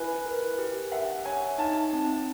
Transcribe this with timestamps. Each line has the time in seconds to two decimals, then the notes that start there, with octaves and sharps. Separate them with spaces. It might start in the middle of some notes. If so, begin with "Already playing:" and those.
Already playing: E4 B4 G#5
0.26 A#4
0.59 G4
0.92 E5 F#5
1.25 C#5 G#5
1.58 D#4 A5
1.93 C4